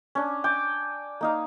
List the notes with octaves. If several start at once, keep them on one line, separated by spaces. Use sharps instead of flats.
C#4 D4
G5 G#5 D6
A#3 D#4 F5